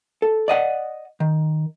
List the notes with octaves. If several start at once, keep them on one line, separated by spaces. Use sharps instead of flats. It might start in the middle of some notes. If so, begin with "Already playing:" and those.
A4
D5 D#5 F#5
D#3